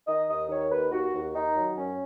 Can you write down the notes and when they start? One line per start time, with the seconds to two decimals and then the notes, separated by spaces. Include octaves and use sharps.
0.07 D#3 D#5
0.28 D#2 D#5
0.49 D#3 C#5
0.70 D#2 B4
0.91 D#2 F#4
1.13 D#2
1.34 D#3 D#4
1.55 F#3
1.76 F#2 C#4